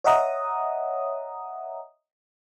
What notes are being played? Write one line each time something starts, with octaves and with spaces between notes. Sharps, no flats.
C#5 D#5 E5 F#5 A#5 D#6